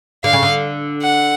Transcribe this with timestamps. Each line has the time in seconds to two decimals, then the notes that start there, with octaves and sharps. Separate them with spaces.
0.24 D3 F5
0.33 C#3
0.43 D3
1.03 F#5